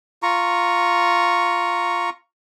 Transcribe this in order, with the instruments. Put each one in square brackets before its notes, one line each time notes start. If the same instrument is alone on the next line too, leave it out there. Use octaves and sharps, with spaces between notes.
[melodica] F4 A#5 C#6